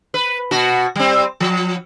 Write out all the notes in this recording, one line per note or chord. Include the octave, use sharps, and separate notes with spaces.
B4
B2 F#4
G3 C4
F3